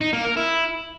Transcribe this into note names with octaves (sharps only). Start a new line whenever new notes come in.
D#4
A#3
A#4
E4